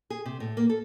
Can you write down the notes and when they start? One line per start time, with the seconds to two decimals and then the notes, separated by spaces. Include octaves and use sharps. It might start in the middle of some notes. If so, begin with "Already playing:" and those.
0.10 G#4
0.26 C3
0.40 A2
0.57 A#3
0.69 A4